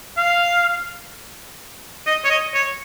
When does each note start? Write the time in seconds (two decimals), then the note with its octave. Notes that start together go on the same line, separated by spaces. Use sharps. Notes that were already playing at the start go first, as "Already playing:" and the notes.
0.18 F5
2.06 D#5
2.25 C#5
2.30 D#5
2.54 C#5